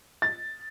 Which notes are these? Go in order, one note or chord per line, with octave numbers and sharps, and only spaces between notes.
A6